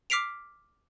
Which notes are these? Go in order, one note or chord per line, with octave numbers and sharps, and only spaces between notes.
D6 F6 B6 C7 D7 F7